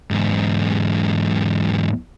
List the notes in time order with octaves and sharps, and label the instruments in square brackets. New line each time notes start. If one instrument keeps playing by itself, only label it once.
[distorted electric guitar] E2 G#2